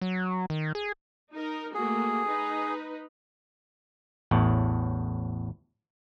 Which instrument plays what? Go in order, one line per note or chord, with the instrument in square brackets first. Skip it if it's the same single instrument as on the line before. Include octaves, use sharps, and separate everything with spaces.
[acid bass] F#3
D#3
G#4
[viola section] D#4 A#4
[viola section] A3 A#3 F#4 [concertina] G#4
[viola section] D#4 B4
[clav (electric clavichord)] A1 E2 A2